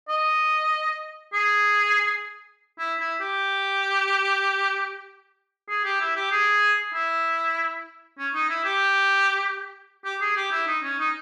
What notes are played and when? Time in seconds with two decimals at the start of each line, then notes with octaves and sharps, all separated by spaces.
0.09 D#5
1.33 G#4
2.79 E4
2.99 E4
3.20 G4
5.69 G#4
5.85 G4
6.00 E4
6.16 G4
6.31 G#4
6.94 E4
8.18 C#4
8.34 D#4
8.49 E4
8.65 G4
10.05 G4
10.21 G#4
10.36 G4
10.52 E4
10.67 D#4
10.83 C#4
10.99 D#4